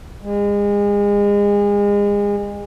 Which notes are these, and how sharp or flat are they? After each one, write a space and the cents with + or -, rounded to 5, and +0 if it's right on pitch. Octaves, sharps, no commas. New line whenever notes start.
G#3 -35